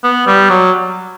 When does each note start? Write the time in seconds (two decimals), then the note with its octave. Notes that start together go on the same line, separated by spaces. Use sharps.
0.03 B3
0.27 G3
0.50 F#3